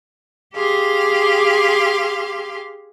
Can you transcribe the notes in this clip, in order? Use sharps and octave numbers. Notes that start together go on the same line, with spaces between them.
G4 G#4 F5 C6